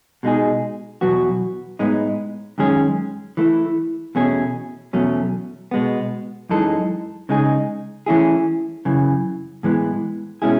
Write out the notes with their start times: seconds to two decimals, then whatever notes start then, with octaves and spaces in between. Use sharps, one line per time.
0.23 B2 G#3 D#4 G#4
1.01 E2 B2 F#3 B3 F#4
1.79 A2 G#3 B3 D#4
2.58 F#2 D#3 G#3 C#4 G#4
3.37 E3 A3 E4
4.15 E2 B2 A3 C#4 G#4
4.93 E2 B2 F#3 A3 C#4
5.71 B2 G#3 B3
6.49 F#2 E3 G#3 D#4 A4
7.29 C#3 G#3 D#4 G#4
8.06 E3 A3 C#4 E4 G#4
8.85 F#2 C#3 E3
9.63 A2 E3 G#3 B3
10.42 B2 G#3 C#4 E4 G#4